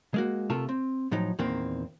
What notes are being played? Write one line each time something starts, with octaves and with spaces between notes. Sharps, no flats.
G#3 A#3 F#4
C3 A3 F4 A4 A#4
C4
A2 F3 F#3 D#4
E2 A#2 D#3 A#3 C4